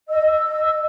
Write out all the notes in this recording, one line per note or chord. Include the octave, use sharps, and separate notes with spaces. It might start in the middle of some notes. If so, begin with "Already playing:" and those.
D#5 E6